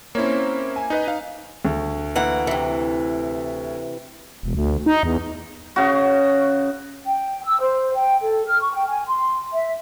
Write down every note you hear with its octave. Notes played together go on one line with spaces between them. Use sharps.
A#3 C4 C#4 E4 C#5
G#5
D#4 B4 D#5
D#4 F5
D2
E3 A#3 F#5
C3 E3
E1
D2
D#4
E2
C#3 F#4
G5
E6
C5
G5
A4
F6
C#6
G5
G#5
C6
E5